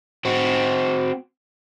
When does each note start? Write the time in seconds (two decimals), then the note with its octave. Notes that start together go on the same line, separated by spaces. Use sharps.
0.25 C4 F#4